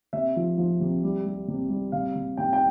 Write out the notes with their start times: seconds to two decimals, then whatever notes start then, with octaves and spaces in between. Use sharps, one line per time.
0.13 C3 E5
0.36 F3
0.58 F3
0.80 C3
1.03 G3
1.26 G3
1.48 C3
1.70 G3
1.92 C3 F5
2.15 C3
2.37 C3 G5
2.53 G5